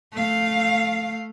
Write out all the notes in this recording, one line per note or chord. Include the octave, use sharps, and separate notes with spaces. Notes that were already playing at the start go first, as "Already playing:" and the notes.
A3 F5